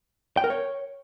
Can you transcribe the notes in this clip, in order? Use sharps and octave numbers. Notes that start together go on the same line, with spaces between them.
G5
A#4
C#5